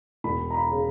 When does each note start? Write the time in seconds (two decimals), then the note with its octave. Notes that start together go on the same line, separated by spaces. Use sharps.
0.24 E1 B5
0.50 A#5
0.54 B5
0.71 C#3